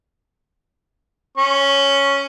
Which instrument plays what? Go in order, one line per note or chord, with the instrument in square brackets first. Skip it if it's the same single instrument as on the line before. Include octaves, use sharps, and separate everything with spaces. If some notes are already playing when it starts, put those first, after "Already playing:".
[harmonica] C#4 C#6